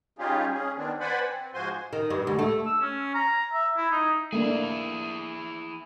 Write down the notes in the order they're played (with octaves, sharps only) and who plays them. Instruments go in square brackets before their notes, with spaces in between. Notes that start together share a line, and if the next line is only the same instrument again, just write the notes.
[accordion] G3 C#4 D#4 F4 G4 G#4
C#4 G#4
D#3 B3 C4 D4
B4 C5 D5 F#5 G#5 B5
C4
G#2 F3 F#4 C5 G#5 C6
[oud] D#3
G2
D2
A3
[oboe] E6
C#4
A#5
E5
E4
D#4
[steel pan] A3 A#3 D4 [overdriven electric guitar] E4 G#4